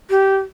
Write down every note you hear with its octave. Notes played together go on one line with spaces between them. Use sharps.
G4